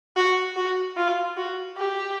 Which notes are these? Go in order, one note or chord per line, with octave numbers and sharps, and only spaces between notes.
F#4
F#4
F4
F#4
G4